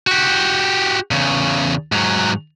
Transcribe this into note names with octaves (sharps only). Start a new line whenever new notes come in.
F#4 G4
E2 C#3
G#2 F#3